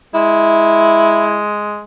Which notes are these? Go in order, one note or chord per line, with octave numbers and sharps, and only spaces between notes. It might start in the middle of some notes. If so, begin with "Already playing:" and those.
G#3 E4